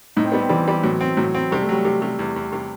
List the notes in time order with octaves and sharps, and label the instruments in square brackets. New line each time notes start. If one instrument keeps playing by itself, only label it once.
[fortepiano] A2 [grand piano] D#4
[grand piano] C4
[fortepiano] G3 [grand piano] B3
[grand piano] C4
[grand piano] E3 [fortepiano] G3
[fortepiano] G3
[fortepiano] A2 [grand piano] F#3
[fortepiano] C4
[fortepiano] A2 [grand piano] F#3
[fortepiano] C4
[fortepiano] C3 [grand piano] G3
[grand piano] A3
[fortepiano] F#3 [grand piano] G3
[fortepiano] C3
C3
E2
E2
C3